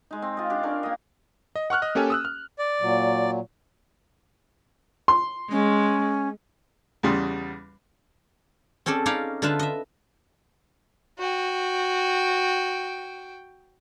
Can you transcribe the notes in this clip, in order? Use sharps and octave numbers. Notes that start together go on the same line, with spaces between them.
G#3 D#4
C4
F4 D#5
D4 G4 D5
C#4 D4 A#4
A#3 D#5
D#5
F#5 C#6 F6 F#6
D#5
A#3 C#4 G4 A4 G#5
D#6 E6 F#6
F6
D5
A#2 F#3
C6
G#3 C#4
E2 C#3 G3 C6
C4 C#4 G#4 A4 D5
C#4 D#4 C#5 D5 F5 B5
D3 F4 B4 E5 A5
D#5 E5
F#4 G5